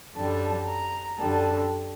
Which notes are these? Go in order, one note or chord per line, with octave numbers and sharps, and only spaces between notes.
F#2 D3 G3 A5
A#5
F#2 D3 G3 A5